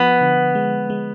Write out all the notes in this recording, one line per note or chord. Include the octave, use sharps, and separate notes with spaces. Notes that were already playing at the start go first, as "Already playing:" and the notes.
Already playing: F3 B3
D3
G#3
G#3